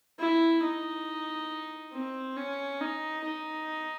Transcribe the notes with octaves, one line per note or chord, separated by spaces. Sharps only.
E4
D#4
C4
C#4
D#4
D#4